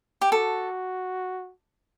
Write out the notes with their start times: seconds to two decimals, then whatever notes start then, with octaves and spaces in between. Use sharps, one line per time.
0.21 G4
0.31 F#4 A4